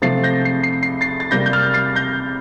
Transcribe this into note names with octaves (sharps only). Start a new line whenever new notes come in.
C3 F3 A3 C4 A6 C7
G6 A#6
C7
C7
C7
A6 C7
A6
C3 G3 A#3 G6 A#6
G6
F6 A6
A6 C7
G6 A#6